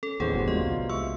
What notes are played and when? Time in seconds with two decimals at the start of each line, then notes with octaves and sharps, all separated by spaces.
0.03 C#4 A4
0.20 A1 D#2 B3 D4 G#4 B4 C5
0.34 F#1 D3 G3 F#4
0.48 E2 G#3 A#3 C#4 F4 D#5
0.61 C2
0.89 G#3 E5 C#6 E6